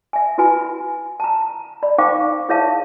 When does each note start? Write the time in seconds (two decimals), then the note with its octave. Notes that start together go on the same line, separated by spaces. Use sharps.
0.13 E5 G#5
0.38 E4 F#4 B4 G#5 B5
1.20 A5 A#5
1.83 D5 B5
1.98 D#4 C5 F5 G5 C#6 D6
2.49 E4 G#4 C#5 E5 F5 A5